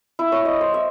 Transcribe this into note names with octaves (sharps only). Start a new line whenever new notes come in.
E4
C#5
D#5
C5
E5